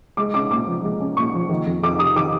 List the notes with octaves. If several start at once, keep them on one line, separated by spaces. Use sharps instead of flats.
G#3 D6
C#4 D6
A#2 D6
F3
G#3
C#4
A#2 C#6
F3
D#3
F2
F2 D6
C3 D#6
D#3 D6